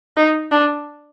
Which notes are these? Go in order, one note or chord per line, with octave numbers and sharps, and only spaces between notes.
D#4
D4